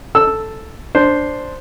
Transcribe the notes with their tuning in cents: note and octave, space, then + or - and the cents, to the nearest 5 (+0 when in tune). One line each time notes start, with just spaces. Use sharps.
A4 +0 E6 +0
D4 +0 C5 +0